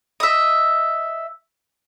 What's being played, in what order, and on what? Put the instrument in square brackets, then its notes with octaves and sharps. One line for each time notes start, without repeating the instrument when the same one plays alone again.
[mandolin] D#5 E5